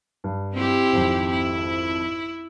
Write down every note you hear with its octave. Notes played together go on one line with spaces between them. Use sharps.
G2
C4 E4 G4
G#1 F2
E4